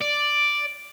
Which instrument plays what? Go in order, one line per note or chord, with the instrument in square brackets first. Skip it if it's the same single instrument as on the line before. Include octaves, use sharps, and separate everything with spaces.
[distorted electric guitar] D5